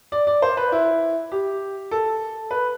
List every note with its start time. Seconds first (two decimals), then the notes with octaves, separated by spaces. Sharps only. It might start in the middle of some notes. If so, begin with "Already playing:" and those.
0.12 D5
0.27 D5
0.42 C5
0.57 B4
0.72 E4
1.32 G4
1.91 A4
2.51 B4